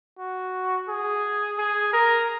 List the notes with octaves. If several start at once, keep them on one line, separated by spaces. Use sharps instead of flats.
F#4
G#4
G#4
A#4